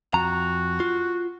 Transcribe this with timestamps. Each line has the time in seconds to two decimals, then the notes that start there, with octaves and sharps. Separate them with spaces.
0.14 F2 F#4 A#5
0.80 F4